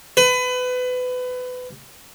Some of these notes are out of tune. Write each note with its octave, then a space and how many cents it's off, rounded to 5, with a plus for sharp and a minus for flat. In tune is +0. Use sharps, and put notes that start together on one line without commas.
B4 +25